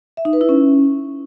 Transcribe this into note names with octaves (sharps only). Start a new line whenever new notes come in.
E5
D#4
B4
E4
C#4